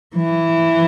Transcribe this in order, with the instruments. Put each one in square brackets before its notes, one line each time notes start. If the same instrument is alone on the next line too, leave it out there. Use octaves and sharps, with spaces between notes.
[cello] E3